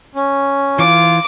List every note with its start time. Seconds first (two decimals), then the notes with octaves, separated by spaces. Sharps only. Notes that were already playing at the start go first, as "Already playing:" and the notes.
0.15 C#4
0.79 E3 F4 D6